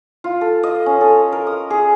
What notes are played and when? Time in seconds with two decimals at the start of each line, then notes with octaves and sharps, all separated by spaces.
0.24 F4
0.41 A4
0.63 D#5
0.86 C#4
1.01 A4
1.32 A#4
1.47 D#6
1.70 G#4